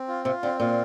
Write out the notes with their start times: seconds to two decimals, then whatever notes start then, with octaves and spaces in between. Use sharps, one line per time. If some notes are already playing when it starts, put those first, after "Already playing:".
Already playing: C4
0.08 F4
0.25 C3 F4
0.43 D3 C4
0.60 A#2 F4